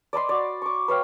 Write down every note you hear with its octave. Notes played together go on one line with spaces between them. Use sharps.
D5 D#5 B5 C6
F#4 D5
C#6 D6
B4 C#5 F5 G5